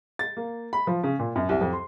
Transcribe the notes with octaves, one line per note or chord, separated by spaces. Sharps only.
A6
A#3
B5
F3
C#3
A#2
F#2
C2
F2
C6